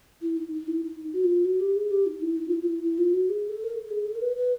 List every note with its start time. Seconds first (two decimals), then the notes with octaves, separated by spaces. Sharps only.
0.22 E4
0.37 D#4
0.53 D#4
0.67 E4
0.83 D#4
1.13 F#4
1.24 F4
1.45 F#4
1.60 G4
1.76 G#4
1.91 G4
2.06 D#4
2.22 E4
2.37 D#4
2.48 F4
2.53 E4
2.62 F4
2.68 E4
2.83 E4
2.98 F4
3.14 F#4
3.29 G#4
3.49 A4
3.64 A#4
3.70 A4
3.85 A4
3.90 G#4
4.05 A4
4.15 A#4
4.22 B4
4.37 B4